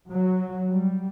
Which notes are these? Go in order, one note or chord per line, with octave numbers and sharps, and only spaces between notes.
F#3
G3